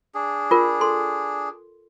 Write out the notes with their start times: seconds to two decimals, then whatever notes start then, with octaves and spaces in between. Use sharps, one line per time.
0.15 D4 G#4
0.51 F4 A#4
0.81 A4 C6